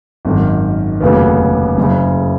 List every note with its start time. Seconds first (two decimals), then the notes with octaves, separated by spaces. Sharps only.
0.25 G#1 F#2 D#3
1.01 F1 D#2 C#3 F#3 B3
1.77 F#1 F#2 C#3